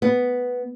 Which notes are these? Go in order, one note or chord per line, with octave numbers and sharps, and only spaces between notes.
B3